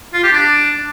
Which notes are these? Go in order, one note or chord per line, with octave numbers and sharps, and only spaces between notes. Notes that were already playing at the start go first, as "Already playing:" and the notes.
F4
G4
D4